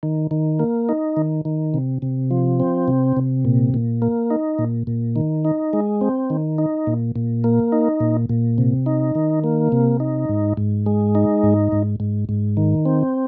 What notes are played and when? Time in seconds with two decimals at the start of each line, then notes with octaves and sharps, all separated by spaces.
0.03 D#3
0.31 D#3
0.59 A#3
0.89 D#4
1.17 D#3
1.45 D#3
1.74 C3
2.02 C3
2.31 F3
2.60 C4
2.88 C3
3.17 C3
3.45 A#2
3.74 A#2
4.02 A#3
4.30 D#4
4.59 A#2
4.87 A#2
5.16 D#3
5.45 D#4
5.73 G#3
6.01 C4
6.30 D#3
6.58 D#4
6.87 A#2
7.16 A#2
7.44 A#3
7.72 D#4
8.00 A#2
8.29 A#2
8.58 C3
8.86 D#4
9.15 D#3
9.44 A#3
9.72 C3
10.00 D#4
10.29 G#2
10.57 G#2
10.86 G#3
11.15 D#4
11.43 G#2
11.72 G#2
12.00 G#2
12.29 G#2
12.57 D#3
12.85 C4